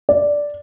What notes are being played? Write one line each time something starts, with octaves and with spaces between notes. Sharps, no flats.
D5